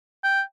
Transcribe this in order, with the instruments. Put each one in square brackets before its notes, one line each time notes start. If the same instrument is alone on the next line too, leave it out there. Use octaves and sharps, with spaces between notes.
[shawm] G5